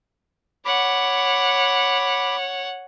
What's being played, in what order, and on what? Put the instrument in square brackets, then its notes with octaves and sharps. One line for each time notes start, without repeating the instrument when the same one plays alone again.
[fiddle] C#5 F#5 [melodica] B5 D6